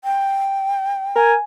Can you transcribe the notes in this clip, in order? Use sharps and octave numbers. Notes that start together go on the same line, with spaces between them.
G5
A#4 G#5